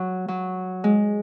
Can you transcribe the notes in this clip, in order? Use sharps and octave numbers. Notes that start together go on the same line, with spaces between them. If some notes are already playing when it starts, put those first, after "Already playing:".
Already playing: F#3
F#3
G#3